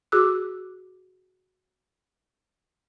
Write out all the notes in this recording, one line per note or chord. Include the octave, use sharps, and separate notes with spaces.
F#4 G#4 D6 E6 F#6